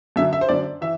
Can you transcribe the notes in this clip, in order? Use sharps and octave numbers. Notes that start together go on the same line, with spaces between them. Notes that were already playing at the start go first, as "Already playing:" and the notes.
F#2 D3 E5
E5
C5
F#2 D3 D5
E3 E5